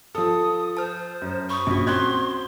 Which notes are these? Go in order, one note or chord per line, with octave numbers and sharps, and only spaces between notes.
F3 A4 D#6
C5 A5 F6
F#2
B5 C#6 D#6
A#1 C#4 F#4
C4 C6 F#6 G#6